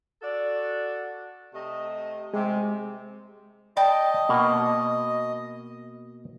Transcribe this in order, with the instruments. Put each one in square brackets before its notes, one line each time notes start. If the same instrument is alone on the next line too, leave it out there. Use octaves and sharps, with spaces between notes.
[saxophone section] F#4 A4 D5
C3 A3 D#5
[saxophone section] C3 [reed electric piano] G#3
[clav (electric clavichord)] D5 [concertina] D#5 [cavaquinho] G5 A5 B5
[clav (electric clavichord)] B2 A#3